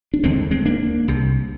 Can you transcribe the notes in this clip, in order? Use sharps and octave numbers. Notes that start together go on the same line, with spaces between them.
D4
D#2 D3 G#3 C4
G#3 C4
A#3 D4
C2 C3